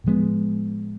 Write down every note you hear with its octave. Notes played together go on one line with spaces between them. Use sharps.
A2 F3 G#3 B3